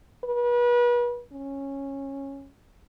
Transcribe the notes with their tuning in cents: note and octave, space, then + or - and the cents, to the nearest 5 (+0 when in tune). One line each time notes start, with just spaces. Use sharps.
B4 -35
C#4 -10